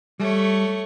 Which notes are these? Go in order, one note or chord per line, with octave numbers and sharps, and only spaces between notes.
G3 A3 C#5